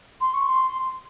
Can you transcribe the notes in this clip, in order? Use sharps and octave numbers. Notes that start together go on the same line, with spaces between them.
C6
C#6
C6